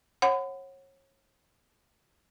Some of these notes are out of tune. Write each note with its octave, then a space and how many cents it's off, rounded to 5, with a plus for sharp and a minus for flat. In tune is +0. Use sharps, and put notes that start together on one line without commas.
C#5 -30 F#5 +0 B5 +40